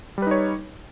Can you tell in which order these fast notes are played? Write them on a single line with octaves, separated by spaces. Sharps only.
G3 B4 D#4 C#5